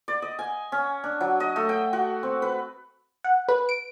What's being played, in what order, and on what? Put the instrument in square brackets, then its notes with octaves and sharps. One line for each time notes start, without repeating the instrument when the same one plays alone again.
[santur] D5
D#5
G#5
C#4
D4
F#3
D#5
A3
G5
F#4
C4
B4
[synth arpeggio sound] F#5
B4
D7